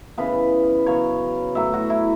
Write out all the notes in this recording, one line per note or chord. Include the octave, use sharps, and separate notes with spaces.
C#3 E3 B3 B4
C#3 F#3 B3 C#5
A2 F#3 B3 E5
F#4
E4